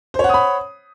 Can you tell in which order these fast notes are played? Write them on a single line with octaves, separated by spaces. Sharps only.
C5 C#5 F#5 D#6 B5